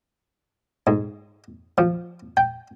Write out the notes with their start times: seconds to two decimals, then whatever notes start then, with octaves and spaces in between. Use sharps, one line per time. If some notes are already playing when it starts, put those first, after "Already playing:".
0.87 G#2
1.78 F3
2.37 G5